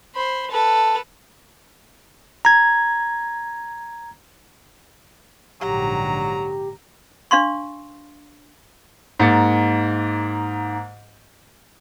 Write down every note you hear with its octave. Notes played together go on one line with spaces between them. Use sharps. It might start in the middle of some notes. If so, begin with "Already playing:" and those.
C5 B5
A4 B4
A#5 G#6
A#1 G#2 D3 F#3 G4 A#5
D4 F5 C6 C#6
G#2 A#3 A6 C#7